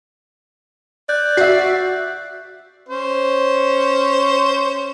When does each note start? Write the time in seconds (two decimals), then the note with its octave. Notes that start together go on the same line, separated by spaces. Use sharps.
1.09 D5 F#6 G6
1.37 F#4 E5 C7
2.89 C#4 C5